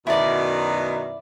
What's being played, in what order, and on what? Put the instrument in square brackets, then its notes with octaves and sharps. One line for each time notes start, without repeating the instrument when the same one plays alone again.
[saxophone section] F#2 B2 D#3 [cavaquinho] E4 D5